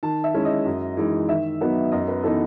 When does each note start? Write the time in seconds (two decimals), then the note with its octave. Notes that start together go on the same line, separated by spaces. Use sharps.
0.03 D#3 A5
0.24 E5
0.34 G#3 C#4 E4
0.45 D#5
0.65 F#2
0.97 E3 G#3 D#4
1.29 D#3 E5
1.61 F#3 B3 D#4
1.92 F#2 D#5
2.08 B4
2.23 E3 B3 D#4 A4